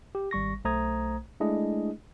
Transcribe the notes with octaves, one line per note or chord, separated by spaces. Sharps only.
G4
G#1 G3 C#6 A#6
B1 A3 C5 A#5 D#6 G#6
G#3 A3 D4 E4 G#4 D#5